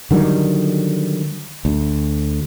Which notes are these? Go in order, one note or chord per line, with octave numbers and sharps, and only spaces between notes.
D3 D#3 F#3 G3
D2